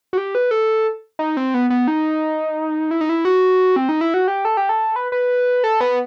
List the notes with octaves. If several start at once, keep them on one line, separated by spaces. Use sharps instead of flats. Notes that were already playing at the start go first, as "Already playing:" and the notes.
F#4
G4
B4
A4
D#4
C4
B3
B3
D#4
E4
D#4
E4
F#4
C4
D#4
E4
F#4
G4
A4
G4
A4
B4
B4
A4
B3